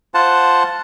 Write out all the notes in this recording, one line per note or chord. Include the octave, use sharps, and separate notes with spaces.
F4 C5 F#5 A5